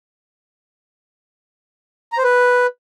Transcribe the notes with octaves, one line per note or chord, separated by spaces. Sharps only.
A#5
C5
B4